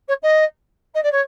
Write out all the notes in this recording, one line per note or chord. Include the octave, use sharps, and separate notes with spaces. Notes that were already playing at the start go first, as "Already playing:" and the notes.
C#5
D#5
D#5
D5
C#5